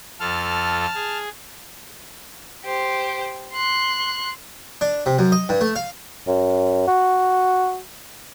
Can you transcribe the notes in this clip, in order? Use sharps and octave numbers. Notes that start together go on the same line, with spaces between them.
F2 F4 A4 A5 F6
G#4
G4 C5
C6 F#6
D4
C3
F#2
D#5
G2
A3
F5
F#2
F#4